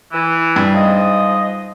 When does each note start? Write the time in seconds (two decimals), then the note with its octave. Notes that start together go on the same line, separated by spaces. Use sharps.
0.12 E3
0.56 G2
0.74 G#2 F3 D#5